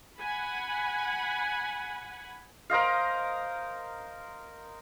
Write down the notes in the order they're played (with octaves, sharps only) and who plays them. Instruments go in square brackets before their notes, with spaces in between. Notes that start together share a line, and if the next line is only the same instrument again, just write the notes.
[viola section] F#5 G#5 B5
[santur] A#4 C5 D#5 F5